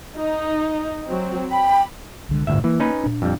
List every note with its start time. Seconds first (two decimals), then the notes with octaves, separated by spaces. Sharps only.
0.15 D#4
1.08 F#3 C4
1.51 G5 B5
2.29 C2 D3 G#3
2.47 G1 D2 A2 E5
2.64 E3 A#3
2.80 C#4 D#4 B4
3.04 A#2 D4
3.22 F2 G3